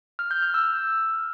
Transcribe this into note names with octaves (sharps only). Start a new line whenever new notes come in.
F6
G6
F6
E6